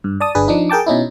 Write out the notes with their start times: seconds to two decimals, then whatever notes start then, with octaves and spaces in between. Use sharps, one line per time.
0.04 G2
0.20 D5 A5 D#6
0.35 G1 D4 G#4 B4
0.48 F3 D4 D#4
0.70 G#4 A#4 G5 A5 D6
0.87 B2 C#4 D#4 E4